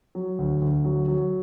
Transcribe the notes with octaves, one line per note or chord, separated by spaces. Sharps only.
F#3
D2
D2
F#3
F#3